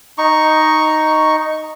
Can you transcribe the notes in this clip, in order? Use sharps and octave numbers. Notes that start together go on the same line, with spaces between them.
D#4 C#6